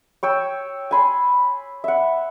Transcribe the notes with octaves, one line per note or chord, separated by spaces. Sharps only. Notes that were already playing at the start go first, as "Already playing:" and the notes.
C#5 G5 E6
G#5 B5 C6
E5 F#5